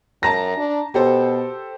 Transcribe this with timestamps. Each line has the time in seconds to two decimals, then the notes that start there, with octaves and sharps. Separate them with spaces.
0.23 F#2 A5 A#5 A#6
0.58 D4
0.94 B2 G4 A4 C5